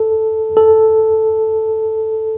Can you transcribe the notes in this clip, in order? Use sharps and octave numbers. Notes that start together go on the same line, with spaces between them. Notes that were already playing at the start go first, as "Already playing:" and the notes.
Already playing: A4
A4